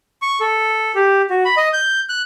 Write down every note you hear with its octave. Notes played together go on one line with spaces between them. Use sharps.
C#6
A4
G4
F#4
B5
D#5
G6
F#6